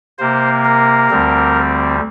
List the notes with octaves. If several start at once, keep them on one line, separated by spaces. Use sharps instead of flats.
C3 A#3 C5
A#4
D2 D3 G3 C4